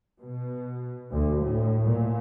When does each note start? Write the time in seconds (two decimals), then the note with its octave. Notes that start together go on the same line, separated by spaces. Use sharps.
0.19 B2
1.12 D2
1.42 A2
1.87 A#2